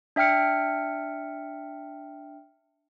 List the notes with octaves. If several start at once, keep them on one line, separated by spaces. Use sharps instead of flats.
D4 E5 G5 F6 C#7